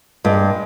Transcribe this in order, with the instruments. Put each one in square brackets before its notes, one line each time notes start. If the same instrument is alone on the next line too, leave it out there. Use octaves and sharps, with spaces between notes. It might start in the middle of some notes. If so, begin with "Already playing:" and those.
[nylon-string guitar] G2 [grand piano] G#3